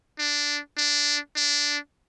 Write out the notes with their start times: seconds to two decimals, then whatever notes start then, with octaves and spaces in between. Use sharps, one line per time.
0.19 D4
0.77 D4
1.36 D4